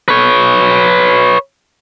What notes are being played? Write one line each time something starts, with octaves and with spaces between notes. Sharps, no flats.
B4 C#5